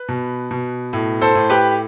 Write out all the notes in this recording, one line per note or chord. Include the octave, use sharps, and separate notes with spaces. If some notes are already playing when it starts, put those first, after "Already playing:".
Already playing: B4
B2
B2
A2
A4 C5
A2
G4 B4